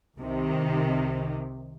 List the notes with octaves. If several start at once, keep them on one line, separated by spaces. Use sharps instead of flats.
C2 C3 D#3